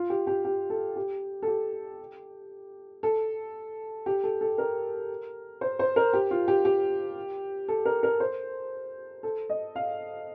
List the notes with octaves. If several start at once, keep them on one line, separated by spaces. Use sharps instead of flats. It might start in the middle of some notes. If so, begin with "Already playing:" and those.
Already playing: F4
G4
G4
G4
A4
G4
A4
G4
A4
G4
A4
A4
A#4
C5
C5
A#4
G4
F4
G4
G4
A4
A#4
A#4
C5
A4
D#5
F5